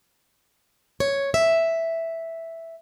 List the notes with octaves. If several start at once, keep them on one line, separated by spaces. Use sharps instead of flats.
C#5
E5